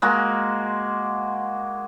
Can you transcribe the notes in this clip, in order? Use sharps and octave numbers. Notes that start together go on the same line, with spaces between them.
G#3 A#3 F#4